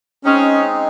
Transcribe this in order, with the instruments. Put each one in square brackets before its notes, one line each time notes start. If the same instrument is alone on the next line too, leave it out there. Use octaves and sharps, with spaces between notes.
[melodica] G#3 C4 D#4 G#4 [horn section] C#4